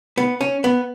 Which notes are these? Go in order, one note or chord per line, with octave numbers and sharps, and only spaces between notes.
B3
C#4
B3